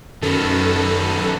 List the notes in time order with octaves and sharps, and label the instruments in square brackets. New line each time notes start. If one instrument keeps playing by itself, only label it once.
[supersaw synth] F#2 A4 [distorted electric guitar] D#3 B3